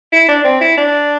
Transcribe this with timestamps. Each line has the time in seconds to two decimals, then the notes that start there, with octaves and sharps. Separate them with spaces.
0.12 E4
0.28 D4
0.44 C4
0.61 E4
0.77 D4